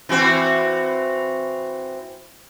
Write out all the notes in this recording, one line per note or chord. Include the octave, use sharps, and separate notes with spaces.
E3 C4 F#4